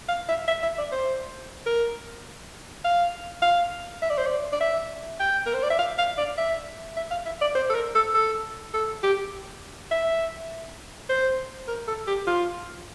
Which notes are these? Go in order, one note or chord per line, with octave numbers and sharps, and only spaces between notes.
F5
E5
E5
E5
D5
C5
A#4
F5
F5
E5
D5
C5
D5
D5
E5
G5
A#4
C5
D5
E5
F5
F5
D5
E5
E5
F5
E5
D5
C5
A4
A#4
A4
A4
A4
G4
E5
C5
A#4
A4
G4
F4